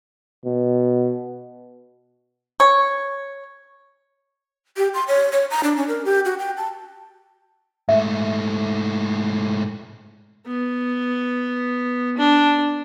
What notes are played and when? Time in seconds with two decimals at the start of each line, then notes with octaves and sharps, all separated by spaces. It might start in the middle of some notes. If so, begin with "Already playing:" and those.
0.46 B2
2.60 C#5
4.77 G4
4.94 C6
5.08 C#5
5.32 C#5
5.50 A#5
5.64 D4
5.76 C#4
5.88 A#4
6.05 G4
6.25 F#4
6.39 G5
6.57 A5
7.89 G#2 A3 E5
10.46 B3
12.18 D4